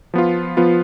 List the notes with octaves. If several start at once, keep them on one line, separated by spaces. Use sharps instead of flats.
F3 B3 F4
F3 B3 F4